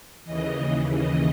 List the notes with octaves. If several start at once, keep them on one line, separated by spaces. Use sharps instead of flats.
D#2 C#3 E3 D#5
D#5